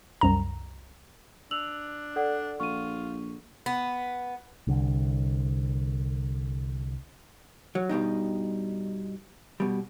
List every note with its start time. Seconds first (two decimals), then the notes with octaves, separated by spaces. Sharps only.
0.21 C2 F#2 A#5
1.51 D4 E6 F7 F#7
2.16 A4 D5 F#5
2.60 A#1 F4 C#6 D#7
3.66 B3
4.67 C2 D3
7.75 F#3
7.89 G2 B2 G3 D#4
9.60 B2 G3